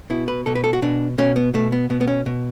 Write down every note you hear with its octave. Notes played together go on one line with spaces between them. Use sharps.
B2 E4
B4
B2 A4
B4
A4
F#4
B2 D4
B2 C#4
B3
B2 A3
B3
B2 B3
B3
C#4
B2